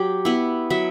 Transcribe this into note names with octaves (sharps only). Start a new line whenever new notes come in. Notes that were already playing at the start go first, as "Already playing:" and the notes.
Already playing: F#3 G4
B3 E4
F#3 E5